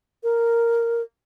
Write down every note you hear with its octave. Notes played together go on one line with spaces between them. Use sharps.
A#4